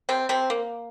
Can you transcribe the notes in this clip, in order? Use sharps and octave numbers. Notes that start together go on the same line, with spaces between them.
C3 C4
C3 C4
A#3